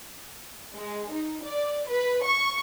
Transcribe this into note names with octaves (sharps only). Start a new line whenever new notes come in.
G#3
D#4
D5
B4
C#6